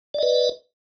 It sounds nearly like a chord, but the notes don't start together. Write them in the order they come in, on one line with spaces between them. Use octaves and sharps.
D5 D#5 B4